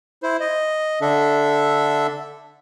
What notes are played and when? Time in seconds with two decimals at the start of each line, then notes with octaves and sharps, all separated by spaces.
0.23 E4 C5
0.40 D#5
1.01 D3 D4 A4 E5